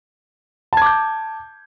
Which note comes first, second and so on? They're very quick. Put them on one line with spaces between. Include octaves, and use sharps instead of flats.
A5 G#6 D6 G6